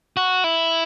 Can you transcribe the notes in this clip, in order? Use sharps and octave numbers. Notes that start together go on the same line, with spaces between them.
F#4
E4